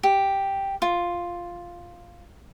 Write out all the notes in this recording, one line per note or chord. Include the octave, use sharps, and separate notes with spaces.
G4
F4